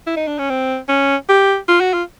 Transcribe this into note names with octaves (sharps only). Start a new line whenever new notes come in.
E4
D#4
D4
C#4
C4
C#4
G4
F4
F#4
F4